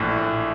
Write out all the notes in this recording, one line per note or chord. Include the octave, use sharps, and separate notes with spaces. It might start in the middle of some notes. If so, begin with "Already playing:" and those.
Already playing: A#1 A2 E3
A#1